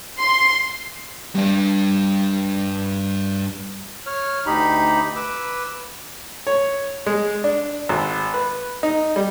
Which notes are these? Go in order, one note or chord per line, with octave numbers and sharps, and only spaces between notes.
C6
G2 D4
C#5 F6
D2 D#4 G4 B5
B4 D6 E6
C#5
G#3
D4
G#1
B4
D#4
G3